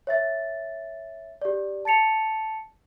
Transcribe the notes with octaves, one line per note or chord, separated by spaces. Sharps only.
C#5 E5 A6
G4 D5
A5 A6 C#7 F7